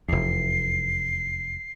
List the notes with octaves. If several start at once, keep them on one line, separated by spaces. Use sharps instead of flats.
F1 E2 C7